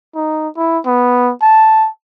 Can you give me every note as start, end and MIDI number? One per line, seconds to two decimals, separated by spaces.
0.15 0.48 63
0.57 0.78 64
0.86 1.32 59
1.42 1.88 81